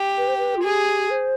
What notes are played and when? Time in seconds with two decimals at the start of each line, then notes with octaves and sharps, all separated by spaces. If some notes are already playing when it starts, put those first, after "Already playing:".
Already playing: G4
0.17 B4
0.28 C5
0.38 B4
0.56 F4
0.64 G4 G#4
1.10 C5